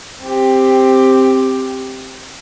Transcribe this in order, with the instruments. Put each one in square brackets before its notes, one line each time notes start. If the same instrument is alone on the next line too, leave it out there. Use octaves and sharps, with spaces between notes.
[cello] C4 G4